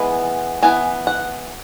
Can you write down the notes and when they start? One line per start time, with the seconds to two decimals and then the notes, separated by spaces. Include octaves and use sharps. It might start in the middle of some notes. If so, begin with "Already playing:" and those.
Already playing: E3 G#3 B3
0.62 E3 B3 G#5
1.07 F#5